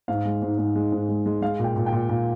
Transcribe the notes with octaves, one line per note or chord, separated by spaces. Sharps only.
G#2 F5
G#3
G#2
G#2
G#3
G#2
G#3
G#3
G#3 F5
A#2
G5
A#2
G5
A#2
A#2